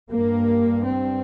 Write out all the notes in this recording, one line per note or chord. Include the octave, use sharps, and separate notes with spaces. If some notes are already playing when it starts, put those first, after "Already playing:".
G2 A#3
C4